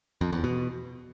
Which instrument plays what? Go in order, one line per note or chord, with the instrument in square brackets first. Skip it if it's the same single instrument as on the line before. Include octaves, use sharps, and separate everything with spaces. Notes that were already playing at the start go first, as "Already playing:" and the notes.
[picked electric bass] F2
E2
B2